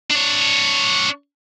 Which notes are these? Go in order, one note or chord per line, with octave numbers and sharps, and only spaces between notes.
D4 C#5